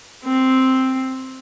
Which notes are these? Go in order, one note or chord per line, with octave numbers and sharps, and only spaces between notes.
C4